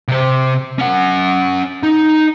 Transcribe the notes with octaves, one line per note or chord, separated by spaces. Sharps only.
C3 C5
C#4 F#5
D#4